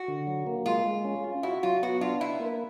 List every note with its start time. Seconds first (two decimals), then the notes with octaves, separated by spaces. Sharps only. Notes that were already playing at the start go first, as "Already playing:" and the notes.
Already playing: F#4
0.08 D3
0.27 F#3
0.47 A#3
0.66 G#3 F4
0.86 G#3
1.05 C#4
1.24 F4
1.43 E4 F#4
1.63 F#3 F4
1.83 B3 F#4
2.01 D4 F4
2.20 E4 B4
2.40 A#3